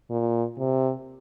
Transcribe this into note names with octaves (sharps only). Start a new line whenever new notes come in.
A#2
C3